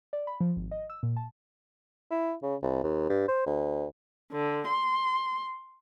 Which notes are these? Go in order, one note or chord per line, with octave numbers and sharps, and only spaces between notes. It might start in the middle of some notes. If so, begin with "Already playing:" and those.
D5
B5
F3
G#1
D#5
E6
A#2
A5
E4
C#3
C2
D#2
G2
C5
D2
D3
C6